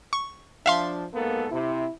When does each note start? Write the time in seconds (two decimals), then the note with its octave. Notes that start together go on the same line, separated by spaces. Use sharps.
0.13 C#6
0.66 F3 D4 E5 F5 C6
1.14 G#2 A#3 B3 A4
1.51 C3 E4